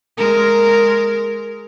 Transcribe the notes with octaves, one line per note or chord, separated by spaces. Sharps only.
G#3 A#4